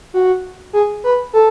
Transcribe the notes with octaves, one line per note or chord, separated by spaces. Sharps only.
F#4
G#4
B4
A4